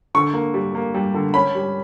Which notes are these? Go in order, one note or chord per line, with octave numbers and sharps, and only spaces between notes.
D3 C#6
A#3
G3
A#3
G3
D3
C#4 B5
G3